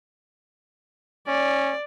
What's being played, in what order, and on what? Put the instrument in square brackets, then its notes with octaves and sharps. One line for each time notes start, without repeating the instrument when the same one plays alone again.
[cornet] C#4 [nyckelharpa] D5